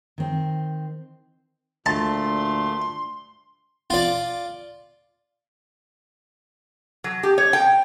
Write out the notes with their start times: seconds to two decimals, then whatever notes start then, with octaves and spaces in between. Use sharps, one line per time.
0.18 D#3 C4
1.86 D2 A#2 A3 A5 C6
3.90 F4 D5
7.04 F#3
7.23 G4
7.38 C#5
7.53 G5